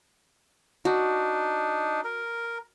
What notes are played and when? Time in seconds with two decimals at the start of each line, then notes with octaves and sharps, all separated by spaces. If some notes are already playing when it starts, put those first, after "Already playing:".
0.85 D4 D#4 F#4
2.04 A#4